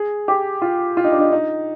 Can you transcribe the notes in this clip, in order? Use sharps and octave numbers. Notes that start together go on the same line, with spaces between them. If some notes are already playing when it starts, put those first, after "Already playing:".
Already playing: G#4
G4
F4
F4
D#4
D4
D#4
D#4